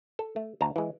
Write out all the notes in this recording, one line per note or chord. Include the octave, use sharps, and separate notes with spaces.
A4
A3
D2 A5 A#5
E3 G#3